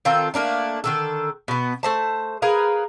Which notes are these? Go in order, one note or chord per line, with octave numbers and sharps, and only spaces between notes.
D#3 C4 F4 A4
A3 A#3 D4 D#4
D3 D#3 A4
B2 B3
A3 C5 A5
G#4 A#4 B4 F5